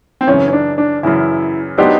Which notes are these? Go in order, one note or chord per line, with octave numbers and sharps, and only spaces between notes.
C4
F#2 C#3 E3 C#4
C#4
D4
D4
F#2 C#3 E3 E4
F#3 B3 D4 D#4 G4 C5